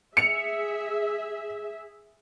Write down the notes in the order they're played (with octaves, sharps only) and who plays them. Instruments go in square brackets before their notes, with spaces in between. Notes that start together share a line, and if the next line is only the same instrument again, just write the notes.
[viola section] G#4 E5 [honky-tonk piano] C#7 F7